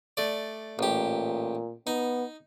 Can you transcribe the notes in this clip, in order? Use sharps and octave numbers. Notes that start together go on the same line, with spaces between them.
A3 D5
A1 A#2 G4
B3 D#4